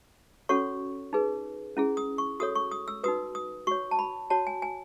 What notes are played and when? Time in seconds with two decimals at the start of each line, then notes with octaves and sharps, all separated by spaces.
0.49 C#4 F#4 A4 C#5 C#6
1.13 D#4 G#4 B4
1.77 C#4 E4 G#4
1.97 D#6
2.18 C#6
2.40 F#4 A4 C#5 D#6
2.55 C#6
2.72 D#6
2.88 E6
3.04 D#4 F#4 B4 D#6
3.35 D#6
3.67 F#4 C#5 C#6
3.91 A5
3.99 B5
4.30 F#4 C#5 A5
4.47 G#5
4.62 G#5